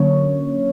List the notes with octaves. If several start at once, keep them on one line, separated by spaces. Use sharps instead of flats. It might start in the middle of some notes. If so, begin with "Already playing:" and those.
Already playing: D3 F#3 A#3 C#4 C#5